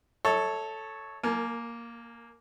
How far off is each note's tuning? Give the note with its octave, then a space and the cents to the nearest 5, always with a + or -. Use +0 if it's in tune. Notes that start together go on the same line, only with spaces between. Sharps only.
A4 +0 C#5 +0 E5 -45
A#3 +0 A#4 -25 G#5 +35